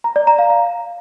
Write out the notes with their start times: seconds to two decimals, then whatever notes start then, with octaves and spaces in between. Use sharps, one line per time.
0.04 A#5
0.16 D5
0.27 A#5
0.39 F5
0.50 F5